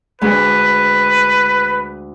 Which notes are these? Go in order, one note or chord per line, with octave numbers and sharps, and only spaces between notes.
D2 G#3 D4 B4